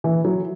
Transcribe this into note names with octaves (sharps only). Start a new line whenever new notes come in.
E3
F#3